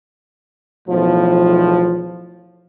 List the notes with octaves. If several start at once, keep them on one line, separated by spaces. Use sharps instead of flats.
B1 E2 A2 F3